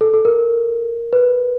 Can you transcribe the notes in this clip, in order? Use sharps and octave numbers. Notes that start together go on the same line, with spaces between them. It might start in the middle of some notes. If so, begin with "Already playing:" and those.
A4
A4
A#4
B4